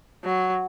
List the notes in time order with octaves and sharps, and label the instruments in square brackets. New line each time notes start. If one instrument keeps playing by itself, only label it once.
[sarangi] F#3